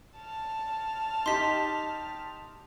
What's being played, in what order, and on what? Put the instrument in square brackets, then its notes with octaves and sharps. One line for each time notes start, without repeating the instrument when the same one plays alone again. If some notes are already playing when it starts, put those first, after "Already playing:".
[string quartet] A5 F6
[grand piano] D#4 G4 D#5 [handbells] C6 B6